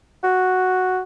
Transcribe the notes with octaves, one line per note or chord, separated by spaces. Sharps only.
F#4